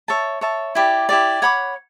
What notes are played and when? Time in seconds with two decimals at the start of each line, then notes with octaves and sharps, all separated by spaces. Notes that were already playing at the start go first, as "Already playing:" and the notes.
0.08 C#5 E5 A5
0.41 C#5 E5 A5
0.75 E4 G4 D5
1.09 E4 G4 D5
1.42 C#5 F#5 B5 D6